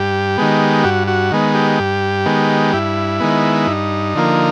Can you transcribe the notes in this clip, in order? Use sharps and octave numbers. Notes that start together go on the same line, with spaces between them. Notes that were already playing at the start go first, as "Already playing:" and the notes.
Already playing: G2 G4
D#3 G#3 B3
G2 F#4
F#4
D#3 G#3 B3
G4
G2
D#3 G#3 B3
G2 E4
D#3 G#3 B3
G2 D#4
D3 F3 A#3